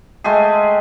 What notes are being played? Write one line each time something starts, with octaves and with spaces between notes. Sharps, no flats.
G#3 A3 G4 G#4